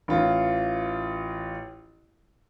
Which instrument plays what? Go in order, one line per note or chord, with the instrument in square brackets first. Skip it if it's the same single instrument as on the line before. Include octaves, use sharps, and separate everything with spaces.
[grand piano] A1 F4